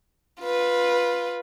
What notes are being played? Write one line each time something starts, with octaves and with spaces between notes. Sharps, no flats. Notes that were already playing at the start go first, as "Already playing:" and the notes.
F4 B4